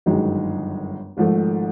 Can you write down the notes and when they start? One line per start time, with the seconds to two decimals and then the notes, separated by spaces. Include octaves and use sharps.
0.06 G1 F#2 D#3 G#3
1.17 G#1 G#2 F3 A3